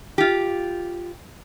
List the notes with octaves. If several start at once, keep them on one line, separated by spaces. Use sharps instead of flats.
F4 G4